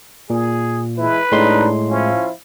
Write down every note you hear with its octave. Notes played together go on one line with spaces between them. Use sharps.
A#2 G#4
E3 G#3 E4 B4
A2 G#3 D4 D#4 C6
F3 C#4 E4 F4